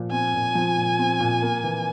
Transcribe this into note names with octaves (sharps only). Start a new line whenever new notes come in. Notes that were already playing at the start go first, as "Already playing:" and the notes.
Already playing: A#2 F3
C4 G#5
A#2
F3
A#2
C4
A#2
A#3
E3